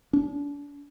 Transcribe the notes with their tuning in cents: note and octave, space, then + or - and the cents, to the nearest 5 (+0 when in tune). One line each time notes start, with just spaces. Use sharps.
D4 -35